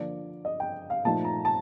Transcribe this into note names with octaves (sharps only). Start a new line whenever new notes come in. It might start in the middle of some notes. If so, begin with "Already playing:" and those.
Already playing: D3 F3 A#3 D5
D#5
G5
F5
A#2 F3 A3 D#4 A5
A#5
A5